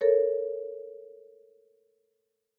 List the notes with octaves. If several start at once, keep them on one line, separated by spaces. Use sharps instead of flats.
A4 A#4 C#5